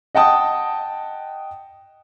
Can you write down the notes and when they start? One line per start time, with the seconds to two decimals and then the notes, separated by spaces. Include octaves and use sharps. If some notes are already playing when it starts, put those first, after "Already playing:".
0.15 D#5 F#5 G5 A5 D#6